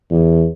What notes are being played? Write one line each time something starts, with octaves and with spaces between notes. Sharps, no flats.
E2